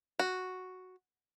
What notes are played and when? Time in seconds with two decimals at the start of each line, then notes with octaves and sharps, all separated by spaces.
0.19 F#4